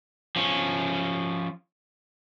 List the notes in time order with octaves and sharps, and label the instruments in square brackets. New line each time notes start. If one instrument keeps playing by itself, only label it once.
[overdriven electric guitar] F3 C#4